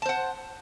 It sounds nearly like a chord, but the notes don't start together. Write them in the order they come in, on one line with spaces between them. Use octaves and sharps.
A5 C5 F#5